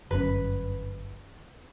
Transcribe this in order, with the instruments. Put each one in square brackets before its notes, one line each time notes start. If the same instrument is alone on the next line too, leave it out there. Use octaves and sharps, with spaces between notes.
[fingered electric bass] G1 F#2 C#4 [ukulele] B4